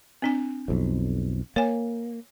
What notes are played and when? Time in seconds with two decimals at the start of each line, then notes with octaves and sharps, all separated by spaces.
0.22 C4 D4 G#5
0.68 B1 F2
1.56 A#3 C#5 G#5